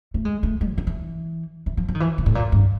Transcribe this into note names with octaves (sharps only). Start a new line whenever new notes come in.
A3
G#3
A3
G#3
D3
D#3
E3
E3
F3
F3
D#3
E3
A#2
A2
A#2
G2